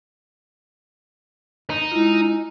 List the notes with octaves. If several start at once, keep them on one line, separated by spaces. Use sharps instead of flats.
D#4
G#3 E4 F4